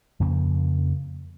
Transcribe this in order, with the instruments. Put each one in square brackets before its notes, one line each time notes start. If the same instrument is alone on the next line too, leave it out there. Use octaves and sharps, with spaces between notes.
[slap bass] F2 C#3 F3 A#3